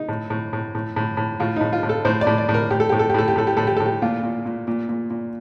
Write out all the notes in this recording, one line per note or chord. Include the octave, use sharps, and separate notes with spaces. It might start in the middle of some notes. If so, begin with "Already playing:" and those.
Already playing: D#4
A2
A2
A2
A2
A2
A2
A2 F4
A2 D#4
F4
A2
A4
A2 C5
D5
A2
D5
A2
A#4
A2 G4
A4
A2 G4
A4
G4
A2 A4
G4
A2 A4
G4
A2 A4
G4
A2 A4
G4
A#2 F4
A#2
A#2
A#2
A#2
A#2